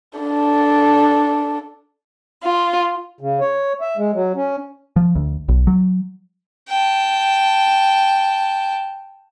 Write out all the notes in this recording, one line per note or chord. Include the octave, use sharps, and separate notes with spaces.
D4 A4
F4
C#3
C#5
E5
G#3
F#3
C#4
F3
D2
B1
F#3
G5 A5